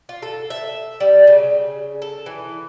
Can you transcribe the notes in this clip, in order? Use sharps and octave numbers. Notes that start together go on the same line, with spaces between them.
F4
A4
E5
G3
C#3
A4
E3